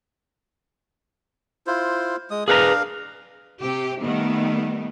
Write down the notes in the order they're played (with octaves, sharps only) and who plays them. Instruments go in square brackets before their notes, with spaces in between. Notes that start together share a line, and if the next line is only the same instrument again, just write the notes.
[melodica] E4 F4 C5
G#3 D#6
[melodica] D4 A#4 F5 [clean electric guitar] G#4 B4 A#5
[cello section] C3 G4
D#3 G3 A3 B3